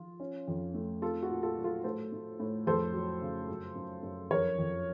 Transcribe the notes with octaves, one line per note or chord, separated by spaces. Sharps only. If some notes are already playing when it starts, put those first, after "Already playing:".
Already playing: F3 F4
C#4
F2
A3
C4 F4 A4
F#4
A#2
F4 A4
F#3
F4 A4
A2 A4 C5
A3
A2
F2 A4 C5
F#3
C#3
F#2
F#2
F#2
F2 A#4 C#5
F2